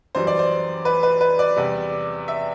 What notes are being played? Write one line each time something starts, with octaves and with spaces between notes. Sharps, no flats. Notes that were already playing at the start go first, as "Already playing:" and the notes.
F#2 E3 G3 C5
D5
C5
B4
B4
B4
D5
E2 C3 G3
E5